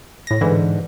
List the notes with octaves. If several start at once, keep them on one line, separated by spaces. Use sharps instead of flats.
A2 A#6
G#2 D3 E3